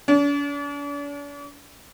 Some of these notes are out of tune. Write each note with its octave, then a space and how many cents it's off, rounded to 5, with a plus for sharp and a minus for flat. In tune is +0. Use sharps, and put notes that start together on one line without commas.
D4 -45